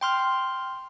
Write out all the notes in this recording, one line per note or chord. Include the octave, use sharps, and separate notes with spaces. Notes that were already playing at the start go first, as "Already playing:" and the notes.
G5 C6 F6